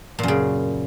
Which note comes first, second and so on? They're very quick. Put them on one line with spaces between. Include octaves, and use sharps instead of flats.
A#2 F#2 C#3